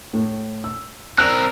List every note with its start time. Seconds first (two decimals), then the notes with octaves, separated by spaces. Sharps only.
0.13 A2
0.64 E6
1.18 C4 A#4 D5 E6 F#6